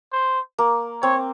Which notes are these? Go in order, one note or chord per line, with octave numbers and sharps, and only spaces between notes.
C5
A#3
C4 C#5